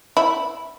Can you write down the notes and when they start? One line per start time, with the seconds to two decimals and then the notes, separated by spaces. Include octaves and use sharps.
0.17 E4